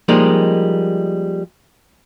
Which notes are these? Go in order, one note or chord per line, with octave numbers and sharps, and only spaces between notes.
F3 G3 G#3 A#3 D#4